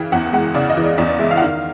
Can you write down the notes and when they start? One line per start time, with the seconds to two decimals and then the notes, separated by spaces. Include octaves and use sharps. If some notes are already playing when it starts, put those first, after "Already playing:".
Already playing: C#3 E3 G5
0.12 E2 F#5
0.33 G#3 F#5
0.54 C#3 D5
0.70 D#5
0.77 E3
0.84 D5
0.98 E2 D5
1.08 D5
1.19 G#3 E5
1.31 F5
1.37 F#5
1.42 D#3 F5